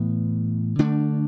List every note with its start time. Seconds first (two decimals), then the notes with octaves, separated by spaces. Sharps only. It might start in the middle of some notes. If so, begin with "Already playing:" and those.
Already playing: A2 E3 B3
0.79 D3 A3 D4